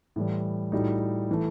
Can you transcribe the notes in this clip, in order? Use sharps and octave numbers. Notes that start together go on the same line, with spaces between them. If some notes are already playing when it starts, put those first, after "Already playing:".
A2 E3 G3
A2 G3 D#4 F#4
E3 A3